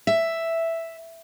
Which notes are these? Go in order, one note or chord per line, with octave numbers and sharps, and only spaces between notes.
E5